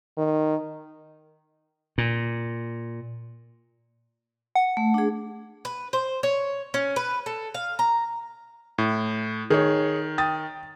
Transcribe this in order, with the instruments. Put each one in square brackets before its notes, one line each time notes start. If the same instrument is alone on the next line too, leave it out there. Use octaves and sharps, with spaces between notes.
[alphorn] D#3
[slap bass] A#2
[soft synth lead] F#5
[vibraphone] A3
D4 G#4
[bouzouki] B4
C5
C#5
C#4
B4
A4
F5
A#5
[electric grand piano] A2
[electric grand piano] D#3 [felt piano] G#4 C#5
[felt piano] G5 D#6 A6